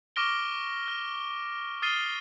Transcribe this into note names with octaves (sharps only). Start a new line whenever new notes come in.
C#6 D6 F6 A#6 D7 G7
F6
D#6 F6 A6 C7 D#7 G7